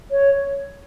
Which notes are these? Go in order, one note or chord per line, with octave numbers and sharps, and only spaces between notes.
C#5